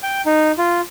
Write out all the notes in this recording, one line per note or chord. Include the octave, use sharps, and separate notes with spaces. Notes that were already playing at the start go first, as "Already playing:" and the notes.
G5
D#4
F4